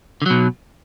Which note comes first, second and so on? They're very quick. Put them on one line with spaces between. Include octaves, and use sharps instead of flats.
D3 F#3 B2